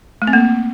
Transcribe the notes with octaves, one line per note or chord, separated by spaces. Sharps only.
A3
C4
A#3